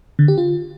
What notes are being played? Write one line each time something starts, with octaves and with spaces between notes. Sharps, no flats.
D3
G4
F4